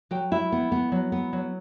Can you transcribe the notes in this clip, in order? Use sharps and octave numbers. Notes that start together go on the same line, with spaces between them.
F#3 G5
E4 E5
B3
B3
F#3
B3
F#3